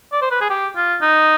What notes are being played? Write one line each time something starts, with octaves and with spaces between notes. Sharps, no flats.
D5
C5
B4
G#4
G4
F4
D#4